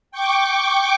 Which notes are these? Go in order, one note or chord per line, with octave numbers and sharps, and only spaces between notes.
G5 C#6 D6